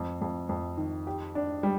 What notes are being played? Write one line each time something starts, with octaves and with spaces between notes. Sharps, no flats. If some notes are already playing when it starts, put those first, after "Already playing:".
Already playing: F2
F2
F2
D#3
G4
D4
G3